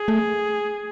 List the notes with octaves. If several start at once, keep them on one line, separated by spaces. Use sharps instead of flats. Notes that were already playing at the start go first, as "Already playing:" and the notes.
Already playing: G#4
A3